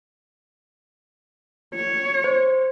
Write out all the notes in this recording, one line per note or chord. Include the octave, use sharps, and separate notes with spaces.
C#5
C5